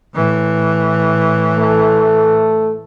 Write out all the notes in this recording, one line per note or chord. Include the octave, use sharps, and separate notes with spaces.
A2 E3
A3